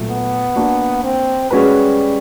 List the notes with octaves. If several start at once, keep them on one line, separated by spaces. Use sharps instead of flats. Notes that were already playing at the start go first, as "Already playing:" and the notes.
Already playing: A#2 F#3 A3
B3
A#3 D4 F#4
C4
G3 G#3 C#4 F#4 B4